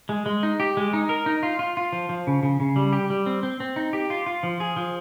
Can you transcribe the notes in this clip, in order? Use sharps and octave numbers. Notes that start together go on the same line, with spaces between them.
G#3
G#3
D#4
G4
G#3
D#4
A#4
D#4
F4
F4
F4
F3
F3
C#3
C#3
C#3
G3
G4
G3
C4
C4
C4
D#4
G4
F4
F4
F3
G#4
F3